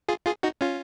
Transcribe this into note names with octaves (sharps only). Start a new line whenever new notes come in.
F4 G#4
F4 G#4
D#4 F#4
C#4 F4